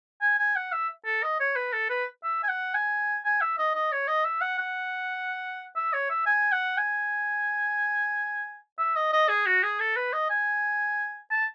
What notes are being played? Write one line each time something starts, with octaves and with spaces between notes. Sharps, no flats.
G#5
G#5
F#5
E5
A4
D#5
C#5
B4
A4
B4
E5
G#5
F#5
G#5
G#5
E5
D#5
D#5
C#5
D#5
E5
F#5
F#5
E5
C#5
E5
G#5
F#5
G#5
E5
D#5
D#5
G#4
F#4
G#4
A4
B4
D#5
G#5
A5